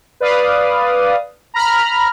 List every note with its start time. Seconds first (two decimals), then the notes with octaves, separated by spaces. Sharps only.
0.20 B4 D5 F5 D#6
1.54 A#5 B5 F6